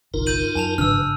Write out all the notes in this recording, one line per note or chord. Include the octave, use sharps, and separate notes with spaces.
G1 C2 D#4 F4 A#4
G6 D#7 F#7
F#2 G#5 A5 F7
G#1 G2 C#3 F3 D4 B4 E6 F6